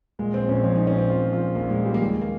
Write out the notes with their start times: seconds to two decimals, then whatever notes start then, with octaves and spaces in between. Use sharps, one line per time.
0.19 A#2 G#3
0.34 A#1 C4
0.49 A#1 C#4
0.64 F3 C#4
0.76 A#2 D#4
0.87 C#4
0.95 A#1 C4
1.10 A#1 F4
1.26 F3
1.33 F4
1.41 A#2
1.55 A#1 A#3
1.70 A#1 G#3
1.85 F3 G3
1.94 A#3
2.01 D#2 G#3
2.22 A#3